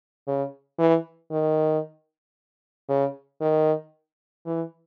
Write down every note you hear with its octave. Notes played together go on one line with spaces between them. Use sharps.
C#3
E3
D#3
C#3
D#3
E3